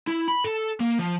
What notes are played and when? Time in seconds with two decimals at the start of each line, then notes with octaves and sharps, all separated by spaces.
0.07 E4
0.28 B5
0.44 A4
0.80 A#3
0.99 F3